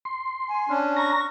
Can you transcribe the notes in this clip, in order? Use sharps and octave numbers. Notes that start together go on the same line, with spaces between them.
C6
G#5
C#4 D4
A#5 C#6 A#6